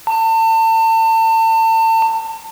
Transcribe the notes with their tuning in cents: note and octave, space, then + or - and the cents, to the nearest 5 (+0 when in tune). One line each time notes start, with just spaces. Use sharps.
A5 +35